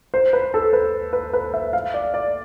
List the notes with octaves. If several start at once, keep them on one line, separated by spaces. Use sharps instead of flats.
C5
B4
A4
B4
B4
B4
E5
F5
D5
D5